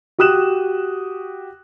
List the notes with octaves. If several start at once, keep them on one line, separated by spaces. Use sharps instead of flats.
F#4 G4 D#6 F#6 E7